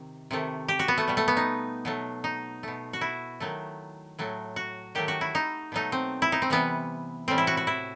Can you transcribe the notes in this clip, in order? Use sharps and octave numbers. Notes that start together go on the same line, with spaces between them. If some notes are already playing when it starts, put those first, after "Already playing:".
Already playing: C3 D#3
C3 D#3 A3
G4
F#4
B3
A3
B2 G3
A3
B3
D#4
B2 F#3 A3
D#4
B2 A3
F#4
E4
D#3 F#3 A3
A2 F#3 A3
F#4
D#3 F#3 A3 G4
F#4
E4
D#4
B2 F#3 A3 D#4
C4
E4
D#4
C4
C3 E3 G3 B3
A2 E3 G3 C4
E4
F#4
F#4
E4